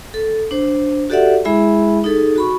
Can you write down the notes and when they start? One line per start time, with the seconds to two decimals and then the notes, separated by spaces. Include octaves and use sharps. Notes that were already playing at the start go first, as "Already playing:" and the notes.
0.14 A4
0.51 D4 C5
1.10 F#4 G4 A4 D5 E5 F#5
1.45 G#3 E4 G#4 E5 B5
2.04 D#4 G#4 A4
2.36 F#4 B5 C#6